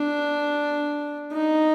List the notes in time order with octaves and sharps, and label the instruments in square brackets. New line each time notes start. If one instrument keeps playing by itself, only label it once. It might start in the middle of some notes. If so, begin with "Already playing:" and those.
Already playing: [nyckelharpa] D4
D#4